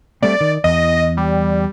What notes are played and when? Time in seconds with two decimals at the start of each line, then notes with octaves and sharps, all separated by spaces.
0.22 G3 A3 C4 D5
0.41 D#3
0.64 E2 D#5
1.17 G3